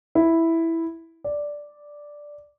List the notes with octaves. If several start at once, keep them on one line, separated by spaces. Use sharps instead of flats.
E4
D5